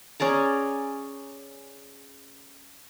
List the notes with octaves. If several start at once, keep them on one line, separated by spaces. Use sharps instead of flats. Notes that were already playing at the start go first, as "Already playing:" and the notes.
C#4 G#4 D5 A#5